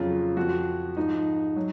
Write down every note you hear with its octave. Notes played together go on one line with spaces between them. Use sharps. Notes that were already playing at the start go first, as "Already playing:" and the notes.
Already playing: F2 C#3 F#3 F4
F2 F3 F#4
G#2 F3 D#4
F#3